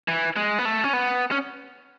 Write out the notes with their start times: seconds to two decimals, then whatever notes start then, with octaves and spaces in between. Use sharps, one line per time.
0.08 E3
0.36 G#3
0.59 B3
0.65 A3
0.84 C#4
0.93 B3
1.31 C#4